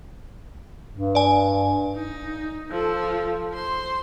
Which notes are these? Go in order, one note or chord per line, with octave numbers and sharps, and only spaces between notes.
G2
D5 G#5
D#4
F3 A4
C5 C6